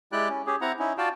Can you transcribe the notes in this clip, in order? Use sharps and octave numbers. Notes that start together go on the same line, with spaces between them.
G#3 E4 G4 D5 G5 F#6
C#4
C#4 G4 G#4
C4 E4 F#5 A#5
C#4 D#4 E4
F4 F#4 D5 F5 G5 A5